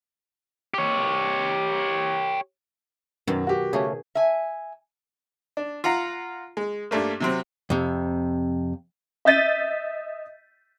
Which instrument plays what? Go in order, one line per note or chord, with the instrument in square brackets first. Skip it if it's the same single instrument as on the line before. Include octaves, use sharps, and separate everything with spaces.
[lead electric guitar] G4 C#5
[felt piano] F#2 [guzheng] B2 D#3 F#3
[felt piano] F#4 G4
[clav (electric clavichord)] C#3 A3 C#4 [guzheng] G#4
[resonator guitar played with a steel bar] E5 G#5
[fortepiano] D4
F4 F5 F#5 A#5
G#3
G2 G3 A3 A#3
C3 F#3 C4
[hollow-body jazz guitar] F2 C3
[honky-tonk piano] D#5 E5 G6 A6 B6 D#7